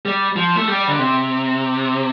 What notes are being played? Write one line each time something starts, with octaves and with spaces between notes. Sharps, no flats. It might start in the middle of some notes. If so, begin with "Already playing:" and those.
G3
F3
A3
G3
D3
C3